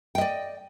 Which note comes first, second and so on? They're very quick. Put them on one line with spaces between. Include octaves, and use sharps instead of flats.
G5 D#5 D5